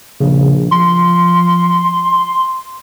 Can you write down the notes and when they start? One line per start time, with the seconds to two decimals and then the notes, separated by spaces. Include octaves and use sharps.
0.20 A#1 C#3
0.71 F3 C6